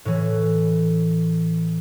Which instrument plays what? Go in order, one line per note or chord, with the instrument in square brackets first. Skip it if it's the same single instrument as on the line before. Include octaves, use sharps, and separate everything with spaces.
[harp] A2 E3